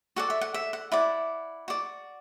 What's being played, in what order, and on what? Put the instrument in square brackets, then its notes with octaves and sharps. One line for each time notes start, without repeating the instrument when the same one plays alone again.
[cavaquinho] F#4 A4 D5 F#5
E5
F#5
E5
F#5
E4 D5 F#5
F#4 D5